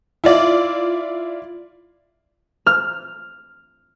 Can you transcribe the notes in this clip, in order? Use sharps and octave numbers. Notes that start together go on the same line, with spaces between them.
E4 F4 D5
F6